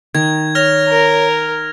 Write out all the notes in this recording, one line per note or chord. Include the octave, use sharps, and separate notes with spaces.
D#3 G#6
C#5 F6 A#6 F7
A#4